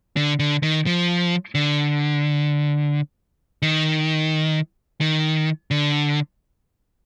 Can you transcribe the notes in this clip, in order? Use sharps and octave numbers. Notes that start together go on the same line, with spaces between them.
D3
D3
D#3
F3
D3
D#3
D#3
D3